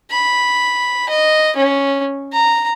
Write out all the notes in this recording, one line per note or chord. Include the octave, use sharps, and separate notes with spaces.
B5
D#5
C#4
A#5